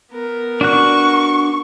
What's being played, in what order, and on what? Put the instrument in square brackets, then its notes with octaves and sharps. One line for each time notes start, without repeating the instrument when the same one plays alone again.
[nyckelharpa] B3 A#4
[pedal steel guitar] D4 F#4 F#6 [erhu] C#6